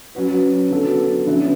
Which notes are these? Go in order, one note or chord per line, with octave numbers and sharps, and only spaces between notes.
F#3 C#4 F#4 B4
D3 F#3 B3 F#4 A4
D3 F#3 C#4 E4 B4